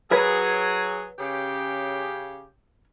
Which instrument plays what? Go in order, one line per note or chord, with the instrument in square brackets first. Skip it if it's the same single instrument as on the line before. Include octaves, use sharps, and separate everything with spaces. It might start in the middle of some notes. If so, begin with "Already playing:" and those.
[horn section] F#3 G#4 [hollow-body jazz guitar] A#4 B4 C#5
[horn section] C#3 G4